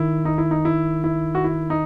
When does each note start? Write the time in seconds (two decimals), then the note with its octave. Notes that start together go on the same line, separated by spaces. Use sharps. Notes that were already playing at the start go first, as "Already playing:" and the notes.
Already playing: D#3 E4
0.25 D#4
0.38 E4
0.51 D#4
0.65 E4
1.04 E4
1.35 F#4
1.44 E4
1.70 D#4